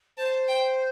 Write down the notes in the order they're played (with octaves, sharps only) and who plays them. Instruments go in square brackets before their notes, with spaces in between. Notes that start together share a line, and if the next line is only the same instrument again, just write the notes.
[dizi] C5 [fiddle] A5
[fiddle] G5